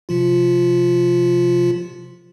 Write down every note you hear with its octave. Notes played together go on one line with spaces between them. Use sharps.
C3 F3 F4